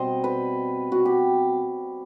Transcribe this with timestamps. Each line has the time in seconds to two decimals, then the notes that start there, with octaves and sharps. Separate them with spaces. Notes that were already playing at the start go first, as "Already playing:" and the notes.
Already playing: B2 G3 C4 C5 D#5
0.24 B4
0.92 F#4
1.05 G4